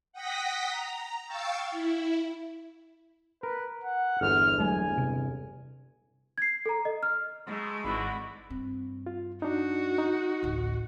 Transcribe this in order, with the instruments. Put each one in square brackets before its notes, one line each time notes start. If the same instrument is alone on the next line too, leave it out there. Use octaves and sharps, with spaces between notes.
[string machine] F#5 G5 D#6 A#6 B6
A#5
F5 G5 C#6 E6 G6 A6
E4
[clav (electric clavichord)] A#4 [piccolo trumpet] B4
[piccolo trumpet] F#5
[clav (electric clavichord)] G1 E2 [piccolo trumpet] F6
[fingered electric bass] F#3 G#3 A3 [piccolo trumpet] G#5
[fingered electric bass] C3
[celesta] G#6 C7
A4 A#5
D#5
F6
[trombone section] G#2 B2 A3 [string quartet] G#3
[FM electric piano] G#1 E3 [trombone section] D3 F#4 [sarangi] B5
[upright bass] G2 C4
[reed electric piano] F4
[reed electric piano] D4 D#4 [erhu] F#4
[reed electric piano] D#4
[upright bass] A1 D2